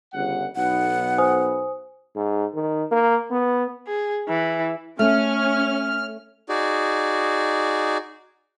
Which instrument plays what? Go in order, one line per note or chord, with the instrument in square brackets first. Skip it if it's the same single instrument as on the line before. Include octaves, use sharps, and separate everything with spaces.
[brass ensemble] G1 C#3 F#5
[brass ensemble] B1 B3 [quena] F#5
[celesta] C5 G#5 D#6
[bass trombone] G#2
D#3
A#3
B3
[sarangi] G#4
E3
[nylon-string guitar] A3 [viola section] C#4 [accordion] F6
[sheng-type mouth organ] D#4 F#4 G#4 D5